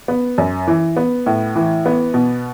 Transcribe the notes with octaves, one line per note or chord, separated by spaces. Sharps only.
B3
F#2
E3
B3
A2
E3
B3
B2